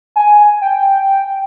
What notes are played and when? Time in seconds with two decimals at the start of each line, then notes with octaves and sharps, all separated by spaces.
0.16 G#5
0.62 G5